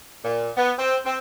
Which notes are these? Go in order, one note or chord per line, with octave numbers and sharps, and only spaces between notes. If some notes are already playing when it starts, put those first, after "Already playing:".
A#2
B3
C4
C4